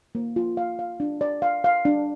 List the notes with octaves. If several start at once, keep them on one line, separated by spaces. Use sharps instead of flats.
A#3
F4
F5
F5
D4
D5
F5
F5
D4